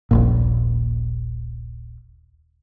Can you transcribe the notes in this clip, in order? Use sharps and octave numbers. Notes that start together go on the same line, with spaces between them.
D#1 A#1 A#2